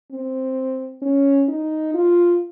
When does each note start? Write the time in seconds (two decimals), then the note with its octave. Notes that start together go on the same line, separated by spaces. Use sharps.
0.12 C4
1.02 C#4
1.48 D#4
1.94 F4